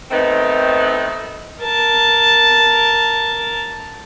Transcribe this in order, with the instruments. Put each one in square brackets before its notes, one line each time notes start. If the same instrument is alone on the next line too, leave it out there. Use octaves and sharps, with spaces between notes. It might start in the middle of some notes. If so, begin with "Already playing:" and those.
[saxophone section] D#3 A3 B3 C4 D#4
[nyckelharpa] A#4 A5